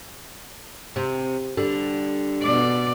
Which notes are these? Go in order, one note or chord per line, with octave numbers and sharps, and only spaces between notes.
C3
D3 G3
B2 D5